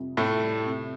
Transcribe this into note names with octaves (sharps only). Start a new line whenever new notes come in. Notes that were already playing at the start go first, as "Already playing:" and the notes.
Already playing: F2 C3 G3
F2 A2 A3
G3
C3